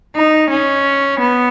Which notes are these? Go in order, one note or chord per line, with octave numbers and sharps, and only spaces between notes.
D#4
C#4
B3